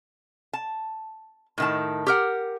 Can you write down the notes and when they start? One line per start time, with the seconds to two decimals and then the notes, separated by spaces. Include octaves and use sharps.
0.53 A5
1.58 A2 D#3 A5
2.07 G4 A#4 F#5